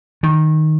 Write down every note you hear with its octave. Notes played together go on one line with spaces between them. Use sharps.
D#3